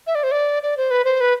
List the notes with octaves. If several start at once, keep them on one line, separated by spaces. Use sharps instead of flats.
E5
D5
C5
D5
D5
C5
B4
C5
B4